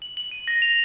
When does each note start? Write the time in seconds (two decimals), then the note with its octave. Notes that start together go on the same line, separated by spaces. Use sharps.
0.02 F#7
0.17 F#7
0.31 D#7
0.48 A#6
0.62 F7